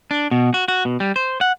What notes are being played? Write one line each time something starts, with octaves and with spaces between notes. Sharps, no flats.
D4
B2
F#4
F#4
B2
G3
C5
F#5